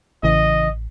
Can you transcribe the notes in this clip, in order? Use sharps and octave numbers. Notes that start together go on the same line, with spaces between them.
A1 C#3 E3 D#5